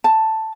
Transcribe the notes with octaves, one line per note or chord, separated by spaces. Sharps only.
A5